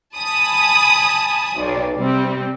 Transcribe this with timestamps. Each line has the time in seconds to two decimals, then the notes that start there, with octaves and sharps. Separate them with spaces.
0.16 G#5 A5 B5 D#6
1.56 B1 D5
1.96 C3 G3 C4